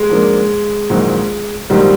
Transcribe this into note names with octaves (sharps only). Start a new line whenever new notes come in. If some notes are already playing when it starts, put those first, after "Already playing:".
Already playing: G#3
G#2 F3 A#3 D4
A#1 G#2 D#3 F#3
A#1 G#2 D#3 F#3 G3